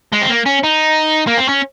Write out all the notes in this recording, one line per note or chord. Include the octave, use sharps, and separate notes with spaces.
G#3
C4
A#3
C#4
D#4
A#3
C4
C#4